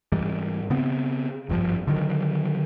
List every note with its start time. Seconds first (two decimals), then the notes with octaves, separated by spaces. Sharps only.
0.12 G#2 E3 G3
0.70 C#3 B3 C4
1.49 G#1 G2 D#3 F3
1.87 D3 D#3 F#3